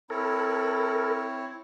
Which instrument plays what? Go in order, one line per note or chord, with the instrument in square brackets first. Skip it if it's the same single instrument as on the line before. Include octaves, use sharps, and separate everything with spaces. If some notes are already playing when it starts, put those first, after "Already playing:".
[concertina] C4 E4 C#5 [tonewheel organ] A4 A#4 [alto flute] B5